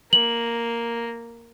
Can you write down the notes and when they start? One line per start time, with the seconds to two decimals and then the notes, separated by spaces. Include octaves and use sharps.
0.13 A#3 F#7